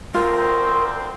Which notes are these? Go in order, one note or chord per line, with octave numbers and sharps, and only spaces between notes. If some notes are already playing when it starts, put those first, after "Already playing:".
D2 C4 F4 A#4 C6